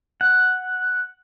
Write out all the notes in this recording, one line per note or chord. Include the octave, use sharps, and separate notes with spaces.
F#5